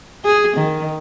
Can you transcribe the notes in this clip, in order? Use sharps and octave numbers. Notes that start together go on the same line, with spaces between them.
G#4
D#3